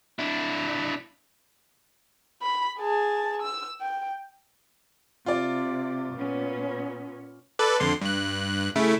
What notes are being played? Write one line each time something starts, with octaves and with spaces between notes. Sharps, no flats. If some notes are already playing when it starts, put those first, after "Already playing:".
D4 E4
B5
G#4 A5
E6
G5
C3 F4 D5
A#2 B3 C#4
A4 B4 D5
F2 D3 C6
G2 F#6
C#3 A3 E4